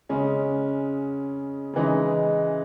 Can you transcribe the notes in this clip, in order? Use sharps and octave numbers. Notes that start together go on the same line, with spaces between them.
C#3 G#3 C#4
C#3 E3 G#3 D#4